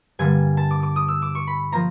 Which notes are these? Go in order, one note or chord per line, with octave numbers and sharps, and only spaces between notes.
G2 D3 G3 A#3 G#5
A5
D6
D6
D#6
E6
D6
C#6
B5
F3 A#3 A#5